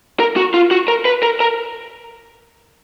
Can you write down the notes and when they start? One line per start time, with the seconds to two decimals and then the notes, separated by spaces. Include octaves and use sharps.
0.20 A#4
0.36 F#4
0.54 F4
0.71 F#4
0.88 A#4
1.05 B4
1.23 A#4
1.40 A#4